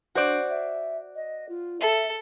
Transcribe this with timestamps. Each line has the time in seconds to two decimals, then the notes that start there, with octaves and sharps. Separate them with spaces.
0.15 D4 F#4 C5 D5
0.50 E5
1.15 D#5
1.49 F4
1.81 A4 E5